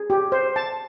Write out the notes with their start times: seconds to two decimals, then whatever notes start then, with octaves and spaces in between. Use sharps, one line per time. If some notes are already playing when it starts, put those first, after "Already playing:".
Already playing: G#4
0.10 G4
0.32 C5
0.56 A5